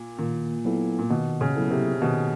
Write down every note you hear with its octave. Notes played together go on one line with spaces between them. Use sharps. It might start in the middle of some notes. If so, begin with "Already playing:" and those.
Already playing: A#2
A#2 D#3
F#3 B3 E4 A4
A#2
B2 D#3
C#3
F#3 B3 E4 A4
C3
B2 D#3